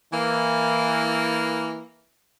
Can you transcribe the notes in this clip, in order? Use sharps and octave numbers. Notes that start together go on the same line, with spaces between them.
E3 A#3